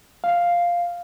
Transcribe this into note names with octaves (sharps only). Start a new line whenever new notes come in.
F5